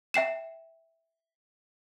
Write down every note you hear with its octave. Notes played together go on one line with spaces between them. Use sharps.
E5 G5 C7 E7